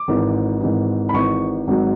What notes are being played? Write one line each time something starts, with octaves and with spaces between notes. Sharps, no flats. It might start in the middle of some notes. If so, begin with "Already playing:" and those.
Already playing: D6
G#1 G#2 E3
G#1 G#2 E3
B5
G#1 G#2 E3 C#6
G#1 G#2 F#3